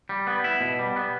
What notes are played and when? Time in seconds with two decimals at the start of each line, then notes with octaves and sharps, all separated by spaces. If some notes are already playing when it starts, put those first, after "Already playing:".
0.09 G3
0.27 B3
0.44 E4
0.61 B2
0.79 G3
0.96 B3